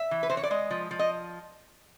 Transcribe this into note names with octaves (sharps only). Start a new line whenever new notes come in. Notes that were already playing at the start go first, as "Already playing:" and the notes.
Already playing: E5
E3
B4
E3 C5
C#5
D5
G#3 D#5
F3
F3
D#5